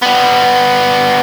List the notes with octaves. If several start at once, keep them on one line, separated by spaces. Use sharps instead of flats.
G3 B3